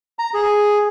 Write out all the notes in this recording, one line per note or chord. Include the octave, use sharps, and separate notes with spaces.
A#5
G#4